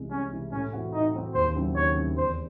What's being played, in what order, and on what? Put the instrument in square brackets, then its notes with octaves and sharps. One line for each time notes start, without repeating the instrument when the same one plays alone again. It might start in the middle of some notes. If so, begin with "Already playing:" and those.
Already playing: [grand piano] C2 C3 E3 G#3
[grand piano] C2 [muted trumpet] C#4
[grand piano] C3 E3 G#3
[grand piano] A2 [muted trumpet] C#4
[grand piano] E3 C4 F#4
[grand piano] A2 [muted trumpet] D#4
[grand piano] E3 C4 F#4
[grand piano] D#2 [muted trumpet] C5
[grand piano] C#3 F#3 C4 E4
[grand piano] D#2 [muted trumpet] C#5
[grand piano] C#3 F#3 C4 E4
[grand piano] E2 [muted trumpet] C5